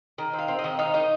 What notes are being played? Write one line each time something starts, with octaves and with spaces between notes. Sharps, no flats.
D#3
C4
F5
C4
D#5
D#3
D#4 F5
D#4 D#5